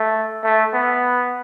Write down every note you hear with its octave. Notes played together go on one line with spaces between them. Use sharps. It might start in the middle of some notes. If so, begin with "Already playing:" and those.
Already playing: A3
A3
B3